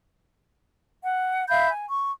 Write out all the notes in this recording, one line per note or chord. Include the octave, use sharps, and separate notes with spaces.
F#5
E5 F5 B5 G6
G#5
C#6